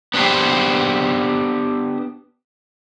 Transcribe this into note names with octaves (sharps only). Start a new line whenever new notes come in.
B3 D4 G4 C5